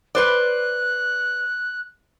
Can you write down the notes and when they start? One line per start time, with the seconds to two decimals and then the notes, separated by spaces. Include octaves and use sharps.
0.15 B4 C5 D5 F#6